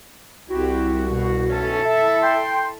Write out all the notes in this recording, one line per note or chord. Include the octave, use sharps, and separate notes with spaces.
C2 C4 E4 F#4 G4
B2
B1 C#4 E4 A4
E5
G5 C6